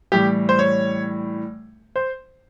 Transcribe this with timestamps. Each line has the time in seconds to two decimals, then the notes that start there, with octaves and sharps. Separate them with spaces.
0.12 A2 E3 G3 G4
0.49 C5
0.59 C#5
1.96 C5